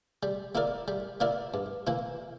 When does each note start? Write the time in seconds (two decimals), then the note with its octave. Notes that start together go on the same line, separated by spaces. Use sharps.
0.23 G3
0.55 A#3 E4 A#4 D5
0.88 G3
1.20 A#3 E4 A#4 D5
1.54 G2
1.87 E3 A#3 E4